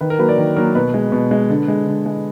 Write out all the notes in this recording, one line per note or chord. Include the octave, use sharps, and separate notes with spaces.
D#3 B4
A#4
F#3 A#3 B4
D5
D#3
F#3 A#3 A#4
B2 B4
G#3
B2
G#3
D3
G#3
D3
G#3